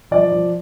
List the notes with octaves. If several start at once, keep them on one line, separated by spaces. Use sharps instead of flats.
F3 D5
F3